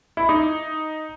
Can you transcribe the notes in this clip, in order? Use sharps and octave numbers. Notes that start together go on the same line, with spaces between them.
E4
D#4